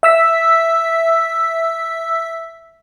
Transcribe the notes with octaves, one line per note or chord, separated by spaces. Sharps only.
E5 E6 B6